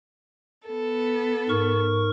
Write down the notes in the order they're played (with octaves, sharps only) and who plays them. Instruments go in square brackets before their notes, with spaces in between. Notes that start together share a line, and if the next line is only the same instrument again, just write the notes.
[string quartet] B3 A4
[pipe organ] G#2 A#4 C#6